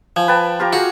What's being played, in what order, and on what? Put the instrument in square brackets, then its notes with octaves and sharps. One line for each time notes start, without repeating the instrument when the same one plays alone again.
[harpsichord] F3 [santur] G#5
[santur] B4 G5 A5
F4 G4 A#5
[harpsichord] F#4 [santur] G#4 F5 A#5